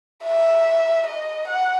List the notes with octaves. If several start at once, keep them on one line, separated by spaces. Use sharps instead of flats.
E5
D#5
F#5